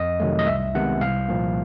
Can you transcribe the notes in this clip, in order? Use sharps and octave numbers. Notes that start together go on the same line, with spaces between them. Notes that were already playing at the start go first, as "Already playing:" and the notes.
Already playing: F2 D#5
C3 D#3 F#3 A3
D#5
C2 E5
C3 D#3 G#3 B3 F#5
C2 F5
A#2 F3 A#3